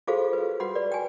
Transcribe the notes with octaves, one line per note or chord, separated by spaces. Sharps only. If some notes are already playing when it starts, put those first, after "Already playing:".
F4 F#4 G#4 A4 C5 F5
B4
F#4 F#5 B5
B4 D5
G5 G#5